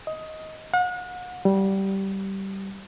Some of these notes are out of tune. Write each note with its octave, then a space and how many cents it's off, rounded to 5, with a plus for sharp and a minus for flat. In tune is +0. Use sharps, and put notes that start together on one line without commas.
D#5 +15
F#5 -40
G3 -15